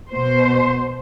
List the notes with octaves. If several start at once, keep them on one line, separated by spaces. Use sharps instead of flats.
B2 C5